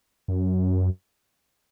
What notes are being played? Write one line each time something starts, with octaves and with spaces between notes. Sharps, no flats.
F#2